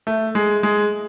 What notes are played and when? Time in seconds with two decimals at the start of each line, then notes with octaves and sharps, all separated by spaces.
0.07 A3
0.35 G#3
0.63 G#3